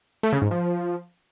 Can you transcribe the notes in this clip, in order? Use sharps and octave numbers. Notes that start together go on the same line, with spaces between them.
A3
C#3
G#2
F3